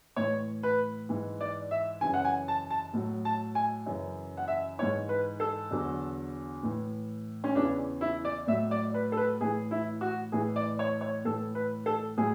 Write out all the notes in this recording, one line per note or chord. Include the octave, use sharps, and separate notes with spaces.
A2 E3 C#5
B4
G#2 E3
D5
E5
F#2 C#3 E3 G#5
F#5
G#5
A5
A5
A2 F#3
A5
G#5
F#2 C#3 E3
F#5
E5
G#2 E3 C#5
B4
A4
E2 D3 F#3
A2 E3
C#4
E2 C#3 E3 D4
E4
D5
A2 F#3 E5
D5
B4
A4
B4
A2 E3 G#4
E4
F#4
A2 E3 G#4
D5
C#5
C#5
A2 E3 A4
B4
A4
A2 F#3 G#4